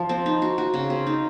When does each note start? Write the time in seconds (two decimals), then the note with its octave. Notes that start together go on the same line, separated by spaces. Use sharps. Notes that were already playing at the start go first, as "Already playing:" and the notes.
Already playing: F3
0.09 C4
0.26 D#4
0.42 F#4
0.58 F#4
0.74 C#3
0.90 C4
1.07 D#4